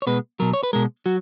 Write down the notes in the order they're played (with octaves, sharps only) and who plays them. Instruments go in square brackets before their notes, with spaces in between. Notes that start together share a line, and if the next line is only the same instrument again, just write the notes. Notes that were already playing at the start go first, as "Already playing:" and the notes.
[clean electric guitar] C#5
B2 G#3 B4
B2 F#3 A#4
C#5
B4
B2 G#3 A#4
F#3 F#4